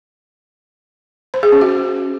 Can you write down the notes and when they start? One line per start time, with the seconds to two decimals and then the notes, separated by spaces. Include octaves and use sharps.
1.34 C5
1.43 G#4
1.52 C#4
1.61 F#4